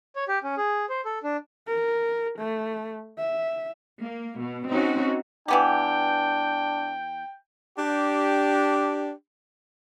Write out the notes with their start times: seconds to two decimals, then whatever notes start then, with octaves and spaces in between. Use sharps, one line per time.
0.16 C#5
0.28 G4
0.43 C#4
0.57 G#4
0.89 C5
1.05 A4
1.23 D4
1.68 A#4
2.39 A3
3.18 E5
4.02 A#3
4.41 B2
4.72 C4 C#4 D#4 F#4
5.48 E3 B3 D4 G4 G5
7.77 D4 G4